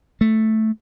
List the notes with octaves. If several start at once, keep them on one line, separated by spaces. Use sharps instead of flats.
A3